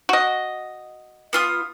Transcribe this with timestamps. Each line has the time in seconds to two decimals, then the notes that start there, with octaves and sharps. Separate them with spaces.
0.09 F#4 D#5
1.33 B3 F4 D#6